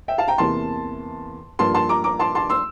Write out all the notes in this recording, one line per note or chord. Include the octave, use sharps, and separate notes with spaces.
E5 G5
F5 A5
G5 A#5
E2 C3 E3 A#3 A5 C6
G2 F3 A#3 A5 C6
A5 C6
A#5 D6
A#5 D6
A5 C6
A5 C6
C6 E6